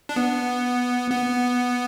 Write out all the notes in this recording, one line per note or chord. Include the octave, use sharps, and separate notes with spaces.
D4
B3
B3